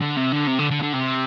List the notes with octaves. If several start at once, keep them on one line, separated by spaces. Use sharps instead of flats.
D3
C3
D3
C3
D3
D3
D3
C3